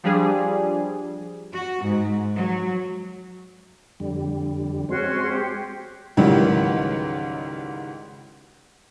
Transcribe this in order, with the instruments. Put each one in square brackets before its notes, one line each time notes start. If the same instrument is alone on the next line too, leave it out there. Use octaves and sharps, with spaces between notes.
[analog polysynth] F3 G3 D4 G#4
[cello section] F#4
G#2
F#3
[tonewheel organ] F2 D3 G3
[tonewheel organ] G#3 C4 [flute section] C#4 F#4 C6
[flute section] G4
[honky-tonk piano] C#2 G#2 D#3 E3 F#3 G3